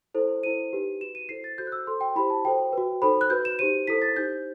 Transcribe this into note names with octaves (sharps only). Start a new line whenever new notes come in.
E4 A4 C5
E4 A4 C5 D#7
D#4 G4 B4
F#4 B4 E7
D#7
E4 A4 C5 C7
A6
F#4 A4 C5 G6
F#6
E6
F#4 A4 C5 C6
G5
E4 G4 C5 B5
A5
F#4 A4 C5 G5
F#4 B4
D#4 A4 C5 B5
F#6
F#4 B4 G6
E7
D#4 G4 C5 D#7
E4 A4 C5 B6
A6
D#4 G4 C5 G6